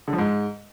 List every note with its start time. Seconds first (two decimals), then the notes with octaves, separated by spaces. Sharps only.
0.08 D3
0.13 F3
0.18 G#2